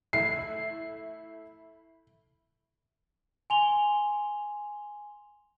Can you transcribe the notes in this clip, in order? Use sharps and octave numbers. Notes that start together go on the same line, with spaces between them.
A3 E4 C7
G#5 C6 F7 G7